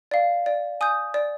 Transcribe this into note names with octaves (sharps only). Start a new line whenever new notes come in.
D5 F5
D5
G#5 D#6 G6
D5